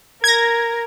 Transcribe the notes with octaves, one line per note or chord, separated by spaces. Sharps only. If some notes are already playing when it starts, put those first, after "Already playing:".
A#4 G#6 A#6